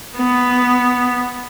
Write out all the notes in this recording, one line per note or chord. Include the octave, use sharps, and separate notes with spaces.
B3